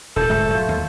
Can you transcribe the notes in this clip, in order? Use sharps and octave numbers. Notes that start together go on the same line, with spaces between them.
D#1 A2 A4 G6
D1 G#2 A3
F#3 A3 F4
D#2